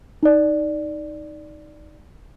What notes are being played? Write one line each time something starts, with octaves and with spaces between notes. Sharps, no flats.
D#4 D5